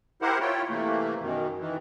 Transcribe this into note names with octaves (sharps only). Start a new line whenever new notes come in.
E4 G4 A#4 C5 F#5
E4 F4 C#5 G5
C3 E3 A3 A#3
F#2 B2 D#3
D#3 E3